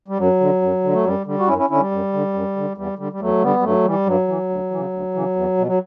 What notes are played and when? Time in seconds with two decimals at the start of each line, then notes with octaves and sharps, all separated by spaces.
0.08 G3
0.18 F#2 F#3
0.40 D3
0.62 F#2
0.84 D3
0.93 A3
1.05 F#2 G3
1.26 D3 G3
1.39 F#4
1.48 F#2 C#4 E4
1.58 C#4 E4
1.70 D3 C#4 E4
1.80 G3
1.91 F#2
2.13 D3
2.34 F#2
2.56 D3
2.77 E2 G3
2.98 D3 G3
3.12 G3
3.20 E2 F#3 A3
3.42 D3 G3 B3
3.59 G3
3.63 G2 F#3 A3
3.85 E3 G3
4.06 G2 F#3
4.28 E3
4.49 D2
4.71 C#3 E3
4.93 D2
5.14 C#3 E3
5.36 E2
5.57 B2
5.67 F#3